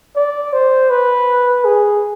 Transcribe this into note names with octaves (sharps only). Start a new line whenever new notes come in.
D5
C5
B4
G#4